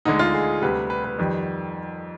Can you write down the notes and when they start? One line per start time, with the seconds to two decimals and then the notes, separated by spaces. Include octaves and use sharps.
0.05 D2 D3 G#3 D#4
0.19 F4
0.34 G#4
0.62 D2 C3 G3 B4
0.90 B4
1.04 B4
1.18 F2 D#3 G3